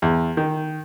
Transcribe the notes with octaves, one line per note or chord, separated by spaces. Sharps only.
E2
D#3